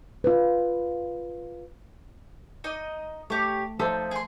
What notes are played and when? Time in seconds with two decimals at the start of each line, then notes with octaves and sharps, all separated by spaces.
0.24 F4 B4
2.64 D#4 D#5
3.30 A3 G4 C#5
3.80 F3 D#4 A4 C5 E5
4.11 G#4 C6